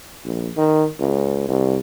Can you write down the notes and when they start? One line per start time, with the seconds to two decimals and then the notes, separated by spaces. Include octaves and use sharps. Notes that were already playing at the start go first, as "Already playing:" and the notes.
0.25 A#1
0.57 D#3
1.00 C#2
1.49 C2